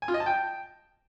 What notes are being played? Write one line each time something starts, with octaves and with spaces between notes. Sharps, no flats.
G#5
F4
D#5
A5
G5